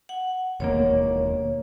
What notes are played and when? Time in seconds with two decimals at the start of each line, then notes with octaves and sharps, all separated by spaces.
0.09 F#5
0.60 E1 D#2 A#3 C#5